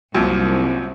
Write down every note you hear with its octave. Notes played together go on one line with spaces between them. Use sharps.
C2 F#2 A#2 F3